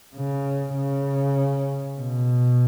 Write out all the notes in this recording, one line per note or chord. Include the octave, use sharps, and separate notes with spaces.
C#3
C#3
B2